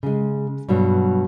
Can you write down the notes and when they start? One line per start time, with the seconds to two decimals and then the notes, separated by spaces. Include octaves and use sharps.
0.03 C#3 G#3
0.69 G2 B2 F#3